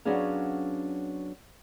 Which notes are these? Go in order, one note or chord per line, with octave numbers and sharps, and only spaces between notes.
F#3 B3 C#4 D4 G#4 F5